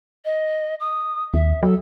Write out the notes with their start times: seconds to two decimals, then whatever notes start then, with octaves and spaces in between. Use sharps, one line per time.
0.25 D#5
0.80 D#6
1.34 D#2 E5
1.63 F#3 A4